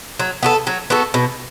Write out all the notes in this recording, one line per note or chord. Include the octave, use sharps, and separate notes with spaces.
F#3
B3 F#4 A4
F#3
B3 F#4 A4
B2